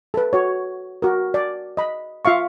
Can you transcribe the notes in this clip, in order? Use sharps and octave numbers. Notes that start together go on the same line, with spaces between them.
A4 B4
F#4 C#5
F#4 A#4
D5
D#5 B5
F4 E5 F5 C#6